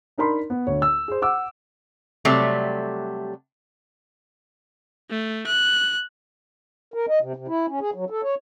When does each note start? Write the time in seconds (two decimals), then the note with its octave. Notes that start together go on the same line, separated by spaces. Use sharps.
0.18 D4 D#4 A#4 B5 C6
0.50 B3
0.67 D2 C#5
0.82 E6
1.08 G#4 C5
1.22 F#5 D6 E6
2.25 C3 F#3 G3 A3
5.10 A3
5.46 F#6
6.94 A#4
7.09 D#5
7.21 C3
7.36 C3
7.48 E4
7.69 C#4
7.81 G#4
7.94 F#3
8.10 A4
8.23 C#5